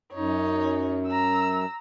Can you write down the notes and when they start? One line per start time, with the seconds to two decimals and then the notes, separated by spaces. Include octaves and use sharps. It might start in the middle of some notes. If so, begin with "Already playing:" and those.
0.13 F#2 D#4 C#5
1.07 A#5 E6